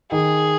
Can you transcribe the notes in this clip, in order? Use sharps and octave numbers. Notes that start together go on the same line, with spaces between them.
D#3 G#4